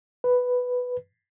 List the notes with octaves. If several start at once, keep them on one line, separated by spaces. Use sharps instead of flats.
B4